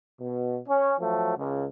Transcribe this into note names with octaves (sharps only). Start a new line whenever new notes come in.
B2
C#4
F3 F#3 A3
C#2